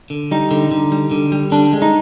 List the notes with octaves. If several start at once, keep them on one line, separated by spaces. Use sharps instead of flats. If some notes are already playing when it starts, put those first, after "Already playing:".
D3
G3 D#4
D3
D3
G3
D3
G3
D3 D4
G#3
D#4